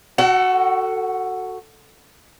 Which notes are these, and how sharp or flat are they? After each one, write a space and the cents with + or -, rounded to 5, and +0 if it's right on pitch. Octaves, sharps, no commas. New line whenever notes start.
F#4 +0 A4 +15 F#5 +40